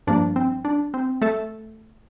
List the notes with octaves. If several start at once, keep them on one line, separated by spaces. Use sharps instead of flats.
G2 F3 A#3 D4
C4
D4
C4
A3 A4